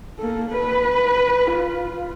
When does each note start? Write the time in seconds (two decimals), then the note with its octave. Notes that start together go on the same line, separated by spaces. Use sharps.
0.19 A#3 A4
0.50 B4
1.51 F4